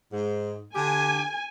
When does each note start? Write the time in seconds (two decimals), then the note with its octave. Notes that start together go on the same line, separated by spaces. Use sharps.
0.12 G#2
0.75 D3 G4 G#5